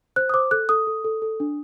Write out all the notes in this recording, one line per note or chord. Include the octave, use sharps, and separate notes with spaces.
C5 F#6
D#6
C5 D6
A4 F#6
A4 D#6
A4
A4
A4
D4